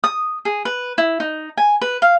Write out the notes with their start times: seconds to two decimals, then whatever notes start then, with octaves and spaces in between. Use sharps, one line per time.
0.04 D#6
0.45 G#4
0.65 B4
0.98 E4
1.20 D#4
1.57 G#5
1.81 B4
2.02 F5